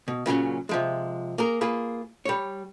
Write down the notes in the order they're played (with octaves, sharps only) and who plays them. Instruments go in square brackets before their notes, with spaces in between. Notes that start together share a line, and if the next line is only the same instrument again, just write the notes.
[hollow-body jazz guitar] B2
A#2 C#3 F#3 C#4
C3 F3 G#3
A#3 G#4 A#4
A#3 F4 G#4 B4
G3 C#5